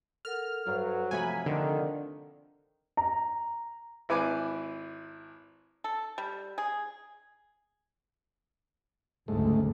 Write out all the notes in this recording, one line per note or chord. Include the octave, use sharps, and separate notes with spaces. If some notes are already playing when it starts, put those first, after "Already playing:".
A4 A#4 F#5 F6
G2 F#3 A4 C5
C3 F3 A3 G#5 A#5 B5
D3 D#3
A#5
G#1 E4 B4 G#5 D6
A4
G3
G#4
F#1 D2 G#2 A3